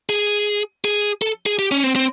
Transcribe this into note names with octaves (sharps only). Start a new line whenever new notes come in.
G#4
G#4
A4
G#4
G4
C#4
C4
C4